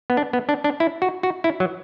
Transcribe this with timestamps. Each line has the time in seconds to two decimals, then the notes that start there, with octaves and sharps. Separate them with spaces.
0.10 B3
0.17 D4
0.33 B3
0.49 D4
0.64 D4
0.80 E4
1.02 F#4
1.23 F#4
1.44 E4
1.60 F#3